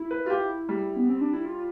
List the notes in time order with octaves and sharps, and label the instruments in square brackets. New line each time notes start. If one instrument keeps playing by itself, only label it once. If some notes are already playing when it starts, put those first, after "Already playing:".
Already playing: [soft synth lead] E4
[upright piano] B4
F4
G4
G3
[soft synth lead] B3
C4
D4
E4
F4